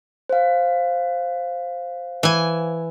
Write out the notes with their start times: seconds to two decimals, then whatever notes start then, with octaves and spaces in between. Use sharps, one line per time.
0.29 C5 F5
2.23 E3 G#5